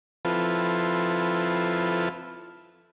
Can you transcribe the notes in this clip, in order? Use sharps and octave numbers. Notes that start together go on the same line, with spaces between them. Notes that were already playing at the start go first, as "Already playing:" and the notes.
F3 C4 E4 F4 A4 B4